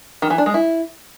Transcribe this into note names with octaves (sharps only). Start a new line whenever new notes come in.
D#3
E3
D4
G#3
E4